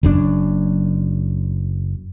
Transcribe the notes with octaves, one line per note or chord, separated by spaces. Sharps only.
F#1 F#2 D4